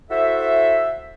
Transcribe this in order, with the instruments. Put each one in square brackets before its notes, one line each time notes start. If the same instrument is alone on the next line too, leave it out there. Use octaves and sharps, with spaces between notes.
[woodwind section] E4 F#4 A4 C5 E5